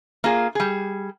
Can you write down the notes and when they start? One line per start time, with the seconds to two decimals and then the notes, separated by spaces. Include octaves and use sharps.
0.24 A#3 F4 G#4
0.55 G3 G#4